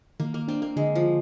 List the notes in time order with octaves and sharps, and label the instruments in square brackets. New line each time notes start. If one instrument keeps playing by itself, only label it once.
[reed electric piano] D#3 [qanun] A#3
[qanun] A#3
[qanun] C4 [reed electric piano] D4
[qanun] A#3
[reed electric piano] D3 [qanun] G#3
[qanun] F3